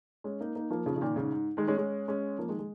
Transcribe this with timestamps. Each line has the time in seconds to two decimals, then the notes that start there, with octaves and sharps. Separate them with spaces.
0.24 G#3 C#4
0.41 A#3 D#4
0.55 A#3 D#4
0.70 F3 A#3
0.86 C#3 F3
0.96 C#3
1.01 A#2 D#3
1.16 G#2 C#3
1.32 G#2
1.57 D#3 G#3
1.67 G#3 C#4
1.78 G#3 C#4
2.08 G#3 C#4
2.38 F3 A#3
2.49 D#3 G#3
2.59 G#3